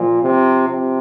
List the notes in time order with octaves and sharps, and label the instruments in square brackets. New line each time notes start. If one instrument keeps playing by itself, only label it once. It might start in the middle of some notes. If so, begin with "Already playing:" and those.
Already playing: [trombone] A#2 [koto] F3
[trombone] C3
C3